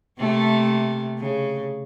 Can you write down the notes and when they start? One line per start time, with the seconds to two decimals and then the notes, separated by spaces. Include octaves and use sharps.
0.19 C3 A3 A#3
1.19 C#3